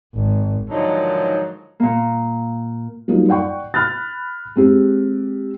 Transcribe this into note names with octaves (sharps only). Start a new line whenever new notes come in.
G#1
G#2 D3 D#3 F3 F#3 D#4
A#2 A#3
F#3 G3 A#3 D#4 F4
D5 F#5 G5 C#6
B5 F6 F#6 A6
G#3 C4 G4